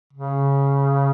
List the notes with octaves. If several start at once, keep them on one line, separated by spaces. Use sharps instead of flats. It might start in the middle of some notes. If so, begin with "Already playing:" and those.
C#3